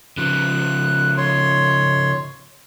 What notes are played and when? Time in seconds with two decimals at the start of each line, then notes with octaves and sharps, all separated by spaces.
0.18 C#3 F3 F#6
1.17 C#5 C6